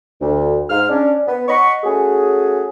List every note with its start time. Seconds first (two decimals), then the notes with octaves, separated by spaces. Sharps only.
0.21 D2
0.69 G#2 F6
0.89 C#4 D4
1.27 B3
1.48 D#5 F#5 B5 C#6
1.84 A3 C#4 F#4 G#4